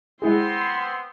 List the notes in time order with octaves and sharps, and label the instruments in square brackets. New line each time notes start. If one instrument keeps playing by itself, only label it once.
[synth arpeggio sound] G#3 E4 G#4 [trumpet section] B3 C4 [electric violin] C6